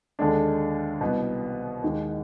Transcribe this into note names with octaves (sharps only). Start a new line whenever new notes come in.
D#2 D3 G#3 D4
C2 B2 B3
D#2 D#3 G#3